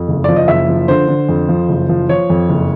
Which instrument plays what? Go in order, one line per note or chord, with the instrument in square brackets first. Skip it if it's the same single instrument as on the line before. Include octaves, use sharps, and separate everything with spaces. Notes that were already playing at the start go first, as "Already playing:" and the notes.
Already playing: [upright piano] F2
F#1
F3 D5
D#5
F#1 E5
F3
D3 C5
D3
F2
F3
F#1
F3
F3 C#5
F2
F#1